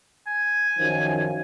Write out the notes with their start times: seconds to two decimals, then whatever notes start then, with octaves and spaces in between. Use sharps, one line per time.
0.27 G#5
0.78 F#2 D#3 F3